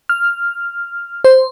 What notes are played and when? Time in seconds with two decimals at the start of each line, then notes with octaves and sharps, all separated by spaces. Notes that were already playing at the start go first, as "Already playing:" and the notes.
0.09 F6
1.24 C5